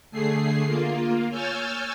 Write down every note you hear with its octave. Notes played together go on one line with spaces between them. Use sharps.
D3 A3 G#4 C7
A#3 F4
C#5 G#5 E6 F6 G6 A6